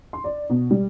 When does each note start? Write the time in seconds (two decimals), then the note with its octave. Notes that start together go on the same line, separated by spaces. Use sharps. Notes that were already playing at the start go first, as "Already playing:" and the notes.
0.13 C6
0.24 D5
0.50 B2
0.71 G3